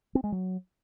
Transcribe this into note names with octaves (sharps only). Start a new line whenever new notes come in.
C4
G#3
F#3